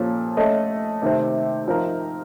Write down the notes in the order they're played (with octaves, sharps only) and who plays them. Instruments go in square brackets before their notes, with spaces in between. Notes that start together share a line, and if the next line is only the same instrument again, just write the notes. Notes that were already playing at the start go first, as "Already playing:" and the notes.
Already playing: [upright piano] A#2 F3 A#3 C#4 A4
A3 C#4 A4 D#5
C3 D#3 A3 C4
F3 C4 D#4 A#4